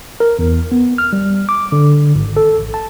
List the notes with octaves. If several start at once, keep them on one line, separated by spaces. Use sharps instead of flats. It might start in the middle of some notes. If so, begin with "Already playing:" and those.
A#4
E2
B3
F6
G3
D6
D3
G#1
A4
A1
A5